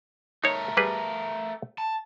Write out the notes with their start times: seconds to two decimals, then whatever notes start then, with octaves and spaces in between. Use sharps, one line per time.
0.44 A3 D#4 A#4 C#5
0.77 G3 G#4 B4
1.78 A5